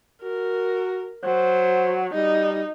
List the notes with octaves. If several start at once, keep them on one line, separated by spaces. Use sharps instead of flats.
F#4 A#4
F#3 C5
G3 D#4